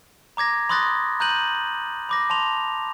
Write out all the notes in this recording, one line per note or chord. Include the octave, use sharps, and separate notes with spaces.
A#5 D6 G#6 A#6
B5 C6 D#6 F#6 A6 A#6
A#5 F#6 G6 D#7 F#7
B5 D6 A#6
A5 C6 F7